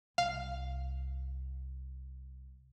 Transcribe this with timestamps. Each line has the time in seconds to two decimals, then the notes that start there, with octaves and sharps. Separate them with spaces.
0.18 C2 F5